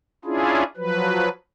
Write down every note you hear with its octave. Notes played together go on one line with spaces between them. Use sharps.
C#4 D4 E4 F4 G#4
F3 F#3 B4